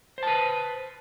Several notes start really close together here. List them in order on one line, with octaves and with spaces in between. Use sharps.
C5 A5 B4